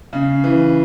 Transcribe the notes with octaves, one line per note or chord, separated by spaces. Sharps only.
C#3
E3